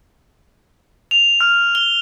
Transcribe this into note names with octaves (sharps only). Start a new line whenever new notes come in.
F7
F6
G7